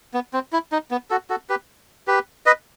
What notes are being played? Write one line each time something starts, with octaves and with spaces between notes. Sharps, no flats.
B3
C4
E4
D#4
B3
F#4 A4
F#4 A4
G4 B4
G4 B4
B4 D#5